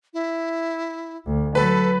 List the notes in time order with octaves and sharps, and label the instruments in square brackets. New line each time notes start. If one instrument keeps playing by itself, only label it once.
[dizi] E4
[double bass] D2
[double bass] F#3 [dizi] A4 [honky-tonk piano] B4